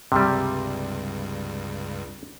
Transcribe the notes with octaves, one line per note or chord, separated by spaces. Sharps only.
C#2 G2 C3 G3